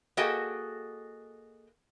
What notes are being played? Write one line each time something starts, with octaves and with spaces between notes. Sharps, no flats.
A#3 F#4 G#4 A4 D#5 G5